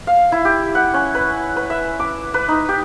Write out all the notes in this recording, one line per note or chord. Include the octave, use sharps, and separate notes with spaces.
F5
E4
G4
F#5
C#4
B4
B4
E5
D6
B4
D#4
G4